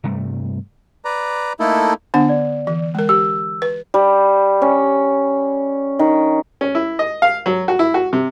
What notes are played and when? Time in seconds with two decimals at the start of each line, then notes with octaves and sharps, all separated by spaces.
0.04 G2 C3 G3 A3
1.05 B4 D5 A#5
1.60 A3 A#3 D#4 E4 A4
2.14 D3 B3 D4 F#5
2.29 D5
2.67 E3
2.95 G#3 A#4
3.09 G4 E6
3.62 B4
3.94 G3
4.62 C#4
5.99 D#3
6.61 C#4
6.75 E4
6.99 D#5
7.22 F5
7.46 F#3
7.68 F#4
7.79 E4
7.94 F#4
8.13 C3